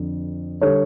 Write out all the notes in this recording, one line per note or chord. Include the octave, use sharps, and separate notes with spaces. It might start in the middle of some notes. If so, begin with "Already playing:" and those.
Already playing: F2 D3
D3 G3 A4 C#5